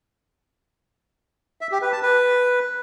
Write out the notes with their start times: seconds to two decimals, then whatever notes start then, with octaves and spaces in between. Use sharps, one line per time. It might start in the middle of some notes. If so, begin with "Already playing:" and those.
1.61 E5
1.72 G4
1.82 B4
1.92 A5
2.03 B4